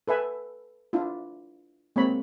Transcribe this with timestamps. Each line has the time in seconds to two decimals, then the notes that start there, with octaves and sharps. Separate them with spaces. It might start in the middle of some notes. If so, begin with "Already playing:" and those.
0.08 A4 B4 E5 G#5
0.93 D4 E4 F4
1.96 G#3 A#3 C4 C#5 B5